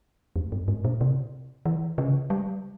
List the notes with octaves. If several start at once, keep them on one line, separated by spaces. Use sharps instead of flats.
F2
G2
G#2
A#2
C3
E3
C#3
G3